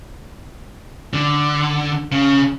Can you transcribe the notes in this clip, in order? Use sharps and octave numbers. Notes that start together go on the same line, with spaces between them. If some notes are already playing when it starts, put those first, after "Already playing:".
D3
C#3